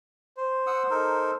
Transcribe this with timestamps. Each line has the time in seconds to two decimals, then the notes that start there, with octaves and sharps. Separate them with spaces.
0.37 C5
0.67 F#5 D#6 E6
0.90 D#4 A4 A#4